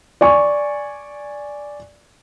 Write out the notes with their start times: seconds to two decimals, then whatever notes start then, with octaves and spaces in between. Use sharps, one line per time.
0.21 D5 G#5 C#6